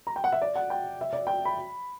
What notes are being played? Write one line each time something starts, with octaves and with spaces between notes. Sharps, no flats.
A#5
G5
F#5
E5
D5
F#5
G5
E5
D5
G5
B5